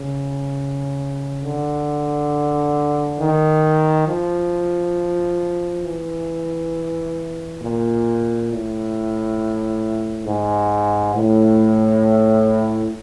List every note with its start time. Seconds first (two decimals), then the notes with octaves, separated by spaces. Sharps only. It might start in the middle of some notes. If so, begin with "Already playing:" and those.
Already playing: C#3
1.42 D3
3.18 D#3
4.07 F3
5.83 E3
7.60 A#2
8.48 A2
10.25 G#2
11.13 A2